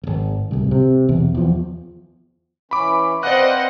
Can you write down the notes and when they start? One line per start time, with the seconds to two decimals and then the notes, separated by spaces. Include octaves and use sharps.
0.03 D1 G#1
0.51 D1 C2
0.71 C3
1.09 B1 E2
1.35 E2 F3
2.71 E3 C#4 B5 D6
3.23 C4 B4 C5 D5 D#5 F5 F#5 F#6